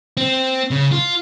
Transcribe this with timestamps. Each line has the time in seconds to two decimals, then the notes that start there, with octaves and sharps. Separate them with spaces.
0.17 C4
0.71 C#3
0.92 F4